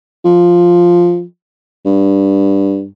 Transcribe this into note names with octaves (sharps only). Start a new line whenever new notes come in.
F3
G2